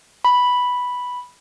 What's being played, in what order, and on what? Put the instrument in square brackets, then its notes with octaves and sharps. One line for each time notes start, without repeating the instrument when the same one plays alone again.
[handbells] B5